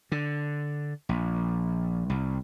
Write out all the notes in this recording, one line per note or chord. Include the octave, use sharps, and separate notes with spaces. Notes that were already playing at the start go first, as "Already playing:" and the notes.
D3
A#1
C2